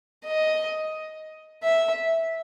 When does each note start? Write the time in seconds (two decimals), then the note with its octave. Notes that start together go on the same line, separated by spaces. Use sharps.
0.26 D#5
1.63 E5